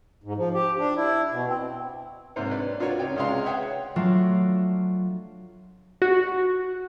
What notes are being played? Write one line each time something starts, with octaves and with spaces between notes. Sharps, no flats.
G#2
F3
G4
D4
E4
B2
C4
G#2 C3 A#3 C5 C#5
D4 B4 D5
D4 F4 F#4 A#4 C#5 D5
C#2 D#4 C#5 D5 G5
C#2 C3 G#3 D#5 F5 C6
G#4 B4 C#5 E5 F#5 G5
F#3 A3 D4 F4
F#4